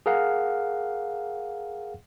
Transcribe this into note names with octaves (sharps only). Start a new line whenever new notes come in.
G#4 A#4 F5 F#5